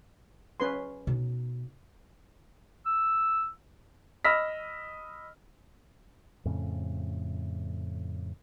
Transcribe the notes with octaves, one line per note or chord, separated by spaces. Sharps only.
C#4 B4 C6
B2 D#4
E6
D#5 B5 E6 F6 A#6 B6
F2 A2 C#3